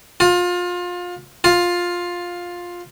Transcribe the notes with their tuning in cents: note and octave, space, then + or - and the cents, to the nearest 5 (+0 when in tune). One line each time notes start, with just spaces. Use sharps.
F4 +25
F4 +10